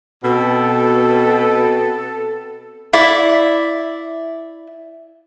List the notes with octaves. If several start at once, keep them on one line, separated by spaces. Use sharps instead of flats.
B2 B3 C4 A4
E4 D5 E5